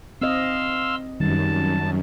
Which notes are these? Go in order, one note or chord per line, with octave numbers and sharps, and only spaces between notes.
C4 D#5 F5 C6 E6
F#2 D#3 G3 A5